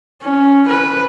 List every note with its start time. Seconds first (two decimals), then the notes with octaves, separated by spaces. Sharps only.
0.22 C#4
0.68 B4